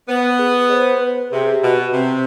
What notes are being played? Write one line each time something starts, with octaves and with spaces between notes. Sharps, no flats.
B3 B4 C5
G#4
D#5
C5
B4
C3 G#4
G4
B2
C3 C4